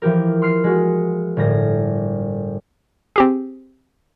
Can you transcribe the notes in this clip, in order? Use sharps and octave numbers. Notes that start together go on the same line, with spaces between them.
E3 F3 E4 G4 A#4
C6 F6 C7
G#3 F#4
G1 A2 A#3 A#6
C4 G4 G#4